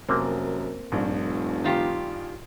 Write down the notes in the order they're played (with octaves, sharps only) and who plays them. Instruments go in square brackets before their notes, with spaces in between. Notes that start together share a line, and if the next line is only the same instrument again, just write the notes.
[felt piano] F1 [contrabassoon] F#2 [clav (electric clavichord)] A#3 C4
[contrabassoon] F1 [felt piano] A#1 G2
[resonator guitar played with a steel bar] D#3 F4 G4